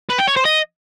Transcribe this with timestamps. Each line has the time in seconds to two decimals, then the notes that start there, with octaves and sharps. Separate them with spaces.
0.10 B4
0.19 G5
0.28 C#5
0.36 C5
0.45 D#5